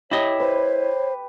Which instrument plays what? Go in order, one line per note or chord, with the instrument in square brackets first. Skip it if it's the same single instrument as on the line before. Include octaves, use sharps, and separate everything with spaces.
[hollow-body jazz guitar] E4 D#5 [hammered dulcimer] G4 [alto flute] C#5
[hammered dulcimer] B4 [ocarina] C5